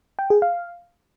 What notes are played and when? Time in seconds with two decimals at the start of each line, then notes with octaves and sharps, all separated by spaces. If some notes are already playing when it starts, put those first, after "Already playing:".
0.19 G5
0.30 G#4
0.42 F5